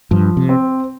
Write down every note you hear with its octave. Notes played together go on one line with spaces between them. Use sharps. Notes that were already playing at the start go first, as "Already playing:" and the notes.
G2 F3
C3
C4